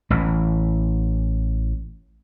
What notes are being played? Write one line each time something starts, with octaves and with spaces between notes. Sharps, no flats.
A1 E3